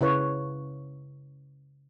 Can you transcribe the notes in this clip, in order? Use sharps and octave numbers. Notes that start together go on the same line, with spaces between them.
C#3 E4 B4 C#5